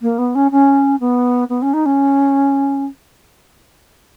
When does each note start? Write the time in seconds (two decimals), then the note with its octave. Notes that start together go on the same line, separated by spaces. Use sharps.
0.02 A#3
0.18 B3
0.35 C#4
0.51 C#4
1.00 B3
1.49 B3
1.62 C#4
1.73 D#4
1.86 C#4